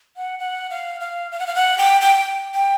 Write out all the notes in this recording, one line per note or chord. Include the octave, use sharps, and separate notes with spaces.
F#5
F#5
F5
F5
F5
F#5
F5
F#5
G5
G5
G5